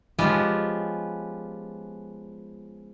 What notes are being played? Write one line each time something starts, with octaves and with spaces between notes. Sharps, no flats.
F3 G#3 B3 C#4 F4 G4